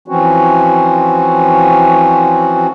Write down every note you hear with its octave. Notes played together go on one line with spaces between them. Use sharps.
E3 F3 C4 C#4 F#4